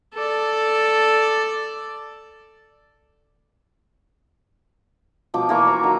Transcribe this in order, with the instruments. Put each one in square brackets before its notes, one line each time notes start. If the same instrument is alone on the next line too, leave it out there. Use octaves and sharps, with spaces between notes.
[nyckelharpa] A4 D5
[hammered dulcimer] B2 F3 D6
E3 A#3 C#6
F5 A#5
D#3 F#3